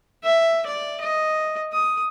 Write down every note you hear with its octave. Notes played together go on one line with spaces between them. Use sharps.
E5
D5
D#5
D#6